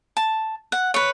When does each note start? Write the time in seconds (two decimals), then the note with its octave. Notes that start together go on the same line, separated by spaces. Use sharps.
0.17 A5
0.72 F#5
0.94 B4 C#5